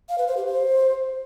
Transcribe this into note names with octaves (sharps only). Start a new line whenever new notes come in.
F5
B4
C5
G4
C5